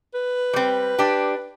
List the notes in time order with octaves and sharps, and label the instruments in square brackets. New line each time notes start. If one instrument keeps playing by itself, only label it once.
[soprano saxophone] B4
[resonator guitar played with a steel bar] G3 C4
D4 G4